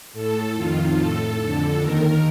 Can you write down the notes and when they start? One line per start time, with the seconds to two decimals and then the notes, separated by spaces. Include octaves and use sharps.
0.13 A2 A4
0.54 F2 D#3 F4
0.95 A2 A4
1.37 F2 D3
1.77 D#2 D#3 A#4